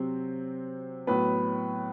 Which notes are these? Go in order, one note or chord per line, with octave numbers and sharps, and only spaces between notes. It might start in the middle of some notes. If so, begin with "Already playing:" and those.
Already playing: C3 F#3 C4
A2 F#3 B3 B4